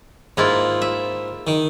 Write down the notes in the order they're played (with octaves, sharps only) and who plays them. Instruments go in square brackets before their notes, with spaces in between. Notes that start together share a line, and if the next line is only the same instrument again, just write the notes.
[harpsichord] G#2 [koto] A#3 E4 F4
[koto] E5
[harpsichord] D#3